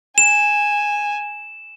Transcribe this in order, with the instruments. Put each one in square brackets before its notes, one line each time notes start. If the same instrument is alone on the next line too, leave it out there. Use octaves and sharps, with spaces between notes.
[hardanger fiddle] G#5 [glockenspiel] E7